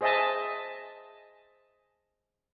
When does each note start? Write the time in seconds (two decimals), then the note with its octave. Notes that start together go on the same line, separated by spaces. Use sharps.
0.01 G#4 C5 D#5 E5 G#5 A5